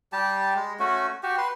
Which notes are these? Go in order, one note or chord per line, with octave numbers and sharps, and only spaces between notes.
G3 G4 A5
G#3
A3 C#4 F#4
F#4 G4
B4 C6